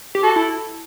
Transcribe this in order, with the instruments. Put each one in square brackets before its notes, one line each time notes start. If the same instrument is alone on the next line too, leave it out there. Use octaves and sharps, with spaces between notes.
[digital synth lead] G4
[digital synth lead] F#4 [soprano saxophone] A4
[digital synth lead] E4